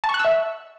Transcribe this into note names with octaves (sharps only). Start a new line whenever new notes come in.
A5
C#6
F#6
E6
E5